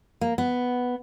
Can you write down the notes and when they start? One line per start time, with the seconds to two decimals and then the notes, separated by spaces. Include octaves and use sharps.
0.21 A#3
0.38 B3